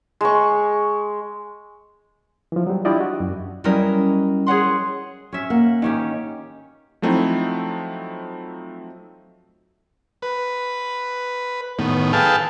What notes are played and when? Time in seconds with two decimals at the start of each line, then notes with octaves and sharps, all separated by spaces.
0.21 G#3 C#6
2.52 E3 F3
2.67 F#3 G3
2.85 D4 E4 F4 G4 D5 D#5
3.00 F#4
3.20 F#2
3.64 F#3 G3 C#4 E4 A#4 D#5
4.46 G#4 C#5 F#5 C6
5.33 C#4 E5
5.50 A#3 F#5
5.82 D#3 C#4 G4
7.02 F3 F#3 A3 C4 D#4 E4
10.22 B4
11.79 A2 D#3 B3
12.13 G#4 A4 B4 F5 G5 A5